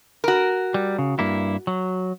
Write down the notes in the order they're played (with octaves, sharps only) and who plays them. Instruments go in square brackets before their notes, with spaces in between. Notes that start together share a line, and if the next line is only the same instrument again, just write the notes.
[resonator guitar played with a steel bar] F#4 A#4
[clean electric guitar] G3
C#3
G2 A#3 E4
F#3